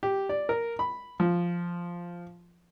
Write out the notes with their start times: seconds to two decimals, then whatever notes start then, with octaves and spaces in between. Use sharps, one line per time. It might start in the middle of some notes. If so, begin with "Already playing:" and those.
0.03 G4
0.29 D5
0.49 A#4
0.79 B5
1.20 F3